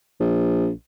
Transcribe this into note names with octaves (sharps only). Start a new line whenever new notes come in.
A#1